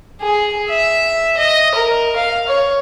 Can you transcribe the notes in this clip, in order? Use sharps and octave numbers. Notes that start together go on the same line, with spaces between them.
G#4
E5
D#5
A#4
F5
C#5